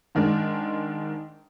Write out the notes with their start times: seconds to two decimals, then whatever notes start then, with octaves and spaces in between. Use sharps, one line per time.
0.15 G#2 D#3 G#3 D4